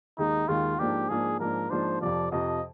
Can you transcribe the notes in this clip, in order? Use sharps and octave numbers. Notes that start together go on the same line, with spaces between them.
D#2 D#3 G#3 D#4
D#2 D#3 G#3 F4
G#2 F3 A#3 D4 G4
G#2 F3 A#3 D4 G#4
G#2 F3 A#3 D4 A#4
G#2 F3 A#3 D4 C5
F2 C3 F3 D5
F2 C3 F3 D#5